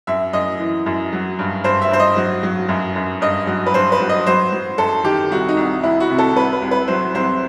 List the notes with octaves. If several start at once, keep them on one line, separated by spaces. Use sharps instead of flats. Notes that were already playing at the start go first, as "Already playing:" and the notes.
F#2 E5
F#2 D#5
E3
F#2
F#3
G2
G2 C5
E5
G2 C5
D#5
F#3
F#3
F#2
F#2
G2 D#5
F#3
B4
G2 C5
B4
F#3
D#5
F#3 C5
F#3
F#2 A4
D#3 G4
C2 F#4
D#4
C2
C2 E4
F#4
C3
A4
C2 B4
B4
C2
B4
F#3 C5
C2 C5